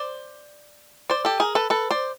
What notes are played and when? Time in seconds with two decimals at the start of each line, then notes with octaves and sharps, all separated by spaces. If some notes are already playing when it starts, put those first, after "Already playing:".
Already playing: C5 D5
1.10 C5 D5
1.25 G4 A4
1.40 G#4 A#4
1.55 A4 B4
1.70 A4 B4
1.91 C5 D5